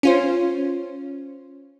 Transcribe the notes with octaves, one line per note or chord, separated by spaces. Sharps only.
C#4 F4 C5